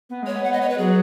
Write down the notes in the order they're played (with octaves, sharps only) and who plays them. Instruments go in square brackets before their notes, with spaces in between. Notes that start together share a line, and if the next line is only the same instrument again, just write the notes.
[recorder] B3
[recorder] G#3 [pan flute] C#5
[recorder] B3
[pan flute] F#5
D#5
C#5
B4
[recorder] F#3 [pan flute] G#4